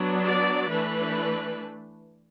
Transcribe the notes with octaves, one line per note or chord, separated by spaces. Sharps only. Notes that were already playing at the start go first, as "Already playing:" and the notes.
Already playing: F#3 B3 D4
D5
E3 A3 D4 B4